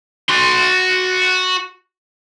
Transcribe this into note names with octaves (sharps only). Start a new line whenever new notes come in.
F#4 C6